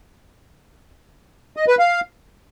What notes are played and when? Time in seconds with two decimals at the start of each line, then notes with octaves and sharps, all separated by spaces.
1.57 D#5
1.68 B4
1.79 F5